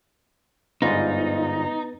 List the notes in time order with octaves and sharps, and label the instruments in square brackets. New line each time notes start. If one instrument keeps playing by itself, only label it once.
[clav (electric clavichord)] G1 G#2 F4 [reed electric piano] B3 B4 A6 [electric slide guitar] D#4